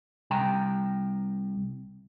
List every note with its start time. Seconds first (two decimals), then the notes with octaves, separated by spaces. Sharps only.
0.31 C2 G5 A#5